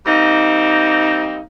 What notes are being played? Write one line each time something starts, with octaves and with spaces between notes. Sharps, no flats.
G3 A#3 C4 D#4